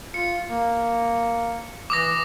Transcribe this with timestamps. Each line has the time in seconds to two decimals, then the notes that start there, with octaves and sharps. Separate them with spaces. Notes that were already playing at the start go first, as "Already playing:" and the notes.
0.14 F4 C#7
0.48 A#3
1.90 E3 D6 D#6 A#6